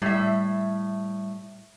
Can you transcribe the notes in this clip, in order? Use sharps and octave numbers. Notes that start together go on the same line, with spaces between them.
A2 G3 E5